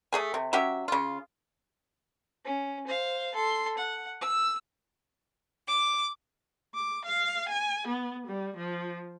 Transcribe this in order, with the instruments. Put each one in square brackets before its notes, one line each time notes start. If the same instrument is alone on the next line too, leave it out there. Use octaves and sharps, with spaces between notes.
[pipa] A3 G#4 G#5
C3
F#3 C#4 G4 E5
C#3 F4
[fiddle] C#4
C5 F5
A4 C6
F#5
E6
[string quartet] D6
D6
F5
G#5
B3
G3
F3